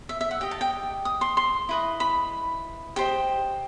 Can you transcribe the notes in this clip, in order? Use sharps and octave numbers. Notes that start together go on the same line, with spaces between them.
E5
E5
F#5
G4 D#5 G5
A5
G5
D#6
C6
C6
E4 B4 D#5
B5
G4 C5 D#5 G5